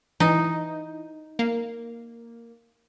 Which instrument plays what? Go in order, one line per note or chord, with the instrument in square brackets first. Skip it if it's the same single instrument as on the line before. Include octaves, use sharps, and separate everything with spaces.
[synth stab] E3 [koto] D#4
[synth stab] A#3